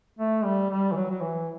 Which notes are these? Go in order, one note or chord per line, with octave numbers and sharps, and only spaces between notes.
A3
G3
G3
E3
F#3
F#3
E3